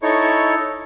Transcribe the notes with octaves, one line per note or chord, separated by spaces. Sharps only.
D#4 E4 A4 C#5 C#6